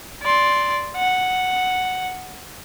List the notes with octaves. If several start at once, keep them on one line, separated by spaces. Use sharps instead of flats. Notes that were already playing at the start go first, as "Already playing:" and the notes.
D5 C6
F#5